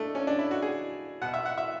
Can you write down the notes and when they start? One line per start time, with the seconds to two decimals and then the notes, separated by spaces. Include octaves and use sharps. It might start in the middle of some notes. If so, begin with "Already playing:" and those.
Already playing: A3 D4
0.15 C#4
0.27 D4
0.39 E4
0.51 F#4
0.62 G#4
1.22 B2 F#5
1.34 E5
1.45 F#5
1.58 E5